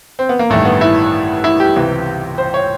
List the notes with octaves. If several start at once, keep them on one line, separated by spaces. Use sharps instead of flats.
C4
B3
A#3
A1 G2 D#3 A3
B3
E4
E4
G4
C#2 C3 E3
C5
C#5